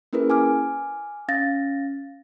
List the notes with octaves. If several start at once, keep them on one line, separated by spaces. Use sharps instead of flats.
A#3 C#4 E4 G#4 A#4 B4
G#5 D6 F6
C#4 F5 A6 A#6